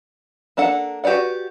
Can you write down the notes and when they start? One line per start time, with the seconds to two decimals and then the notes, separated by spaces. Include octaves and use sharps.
0.57 A#3 D4 A4 F#5
1.04 F#4 G4 B4 D5 F#5